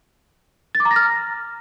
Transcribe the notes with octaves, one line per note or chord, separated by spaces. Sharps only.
A6
D6
A#5
A#6
F6